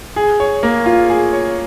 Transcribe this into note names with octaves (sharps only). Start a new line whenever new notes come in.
G#4
C#5
A#3
F4
G#4
C#5